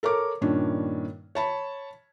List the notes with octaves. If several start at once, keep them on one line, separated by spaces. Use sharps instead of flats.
A4 A#4 C#5 D6
G2 A#2 D#3 C#4 D4
C#5 A5 B5